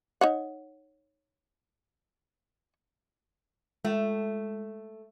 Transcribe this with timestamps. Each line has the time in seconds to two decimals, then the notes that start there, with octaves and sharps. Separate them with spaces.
0.21 D#4 C#5 F#5
3.85 G#3 A3